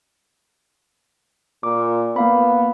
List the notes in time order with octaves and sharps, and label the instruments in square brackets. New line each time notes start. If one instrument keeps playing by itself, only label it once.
[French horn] A#2 [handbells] D6
[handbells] A#3 F5 B5 [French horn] B3